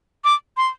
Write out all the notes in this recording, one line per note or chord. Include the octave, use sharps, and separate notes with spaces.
D6
C6